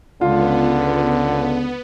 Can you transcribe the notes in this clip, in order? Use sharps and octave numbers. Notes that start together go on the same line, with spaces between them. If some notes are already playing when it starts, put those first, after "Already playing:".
C#2 D3 B3 F4